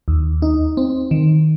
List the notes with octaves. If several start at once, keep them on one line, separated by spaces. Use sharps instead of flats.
D#2
D#4
C4
D#3